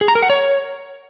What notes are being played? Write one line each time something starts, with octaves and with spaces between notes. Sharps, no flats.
G#4
A#5
A#4
F#5
C#5